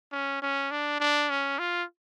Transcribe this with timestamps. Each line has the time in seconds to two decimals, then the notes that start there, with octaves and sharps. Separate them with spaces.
0.12 C#4
0.42 C#4
0.71 D4
1.01 D4
1.30 C#4
1.59 F4